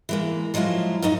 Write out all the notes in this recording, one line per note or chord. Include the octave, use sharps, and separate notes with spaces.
E3 G#3 A#3
F3 F#3 G#3 E4 F4
F#2 A2 F#3 D#4 D#5